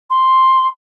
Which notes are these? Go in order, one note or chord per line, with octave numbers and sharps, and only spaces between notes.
C6